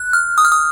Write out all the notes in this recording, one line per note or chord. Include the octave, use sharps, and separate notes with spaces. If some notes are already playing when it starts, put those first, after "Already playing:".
Already playing: F#6
F6
D#6
F6
D#6